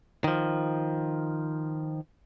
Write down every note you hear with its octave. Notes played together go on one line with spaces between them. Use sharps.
D#3 F3